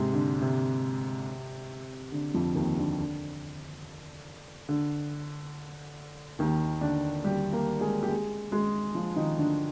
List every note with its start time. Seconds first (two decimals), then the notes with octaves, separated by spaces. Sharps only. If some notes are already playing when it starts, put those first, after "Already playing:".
Already playing: G#2 C3 G#3
0.13 D3
0.41 C3
2.12 D3
2.34 F2 F3
2.55 D#2 D#3
2.77 D3
2.98 D3
4.69 D3
6.39 D#2 D#3
6.81 D3 D4
7.24 G3 G4
7.52 A#3 A#4
7.81 G#3 G#4
8.03 G4
8.09 G#3 G#4
8.52 G#3 G#4
8.95 F3 F4
9.16 D#3 D#4
9.38 D3 D4